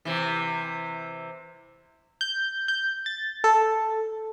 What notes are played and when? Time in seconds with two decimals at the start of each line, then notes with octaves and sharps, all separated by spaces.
0.05 C3 E3
2.21 G6
2.68 G6
3.06 A6
3.44 A4